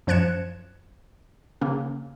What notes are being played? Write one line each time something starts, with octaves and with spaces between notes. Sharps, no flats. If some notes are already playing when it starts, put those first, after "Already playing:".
F#2 F3 F#6 G#6 C#7 E7
C#3 A#3 C#4